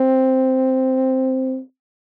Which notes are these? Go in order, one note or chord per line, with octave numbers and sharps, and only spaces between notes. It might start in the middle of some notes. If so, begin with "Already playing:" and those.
Already playing: C4